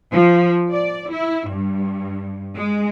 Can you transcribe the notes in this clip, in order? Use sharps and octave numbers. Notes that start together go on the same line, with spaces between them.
F3
D5
E4
G2
G#3